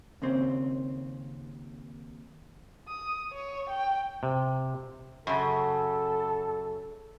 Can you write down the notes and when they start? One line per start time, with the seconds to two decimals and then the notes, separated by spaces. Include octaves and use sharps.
0.22 D#2 C#3 C4
2.88 D#6
3.33 C#5
3.70 G5
4.23 C3
5.27 F#2 C#3 A4